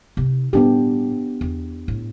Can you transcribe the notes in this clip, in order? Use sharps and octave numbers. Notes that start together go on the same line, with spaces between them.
C3 D#4
A2 G3 B3 D4 G4
E2
A2